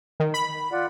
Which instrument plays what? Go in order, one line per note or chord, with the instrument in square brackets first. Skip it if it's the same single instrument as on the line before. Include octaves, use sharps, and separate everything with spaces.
[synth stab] D#3
B5
[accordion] F4 D5 F#5